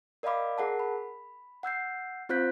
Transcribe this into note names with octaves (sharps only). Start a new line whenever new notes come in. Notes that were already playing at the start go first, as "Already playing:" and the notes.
A#4 D5 D#5 F5 B5 D6
G#4 A#4 F#5 A5
B5
F#5 E6 G6 C7
C4 F4 C5 F#6 G6 B6